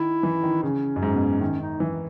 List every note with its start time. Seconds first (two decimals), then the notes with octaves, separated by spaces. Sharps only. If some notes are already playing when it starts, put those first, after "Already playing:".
Already playing: D#3 E4
0.23 E3
0.43 D#3
0.63 C#3 C#4
0.96 F#2
1.03 G#2
1.15 B2
1.41 D#3 C#4
1.61 D#4
1.80 E3